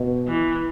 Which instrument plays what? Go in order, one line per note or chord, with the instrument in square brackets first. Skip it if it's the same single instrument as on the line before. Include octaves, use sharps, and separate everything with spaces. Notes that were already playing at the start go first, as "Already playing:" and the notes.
Already playing: [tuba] B2
[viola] E3